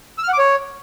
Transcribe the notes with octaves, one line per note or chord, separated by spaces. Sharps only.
E6
F6
F#5
D6
C#5